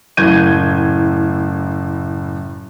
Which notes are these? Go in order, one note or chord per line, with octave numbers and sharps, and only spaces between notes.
F#1 A2 G6 G#6 D#7